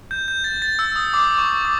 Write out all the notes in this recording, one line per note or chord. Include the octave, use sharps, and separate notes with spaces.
G6
G6
A6
A6
E6
D#6
D6
C#6
D6